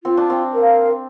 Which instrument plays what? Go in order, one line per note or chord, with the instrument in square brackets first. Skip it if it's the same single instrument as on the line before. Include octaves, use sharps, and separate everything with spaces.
[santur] C4 [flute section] F4
[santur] D4
C4
[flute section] A#4 F5